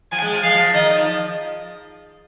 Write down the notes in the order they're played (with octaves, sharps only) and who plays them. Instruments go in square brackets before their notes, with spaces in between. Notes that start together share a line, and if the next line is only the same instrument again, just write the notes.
[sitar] F3 [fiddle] G#5
[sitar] G#3
F3
[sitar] G#3 [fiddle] F5
[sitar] F3
[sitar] D#3 [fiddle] D#5
[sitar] F3